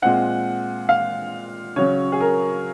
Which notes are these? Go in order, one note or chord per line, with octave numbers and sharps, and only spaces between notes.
A#2 G#3 C4 F#5
F5
C#3 F#3 C#4 C#5
G#4
A#4